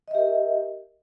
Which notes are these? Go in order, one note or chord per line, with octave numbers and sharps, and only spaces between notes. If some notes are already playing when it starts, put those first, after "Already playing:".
G4 A#4 D#5 E5